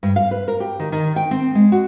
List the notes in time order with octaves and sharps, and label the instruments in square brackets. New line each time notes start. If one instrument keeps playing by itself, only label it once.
[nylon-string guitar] G2
F5
B4
A#4
G4
D#3
D#3
G5
C4
G#3
F#4